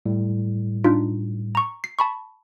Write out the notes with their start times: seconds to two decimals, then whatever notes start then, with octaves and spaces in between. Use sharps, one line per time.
0.06 A2 G3
0.84 D4 D#4 F4
1.55 A#5 C#6
1.84 C7
1.99 A5 B5 C#6